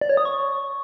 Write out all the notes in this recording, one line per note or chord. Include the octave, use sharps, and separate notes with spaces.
D5
C#5
D#6
C#6